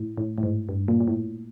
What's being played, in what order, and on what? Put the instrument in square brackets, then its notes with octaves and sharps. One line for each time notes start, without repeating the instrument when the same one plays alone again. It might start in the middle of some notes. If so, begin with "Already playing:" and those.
Already playing: [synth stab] A2
A2
A2
G#2
G2
A#2
A#2
A2